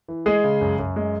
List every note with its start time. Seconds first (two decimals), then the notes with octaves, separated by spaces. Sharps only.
0.08 E3
0.26 G#3 G#4
0.44 C#3
0.61 F#2
0.79 F#2
0.96 G#3